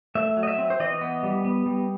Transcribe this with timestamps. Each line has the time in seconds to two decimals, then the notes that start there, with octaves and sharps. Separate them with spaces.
0.15 A3 E5
0.37 F#3
0.43 D#5
0.47 E5
0.58 C4
0.70 C5
0.80 E3 D#5
1.01 B3
1.23 G3
1.45 B3
1.66 G3